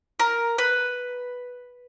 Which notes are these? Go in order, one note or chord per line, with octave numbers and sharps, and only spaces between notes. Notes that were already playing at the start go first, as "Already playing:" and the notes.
A#4
B4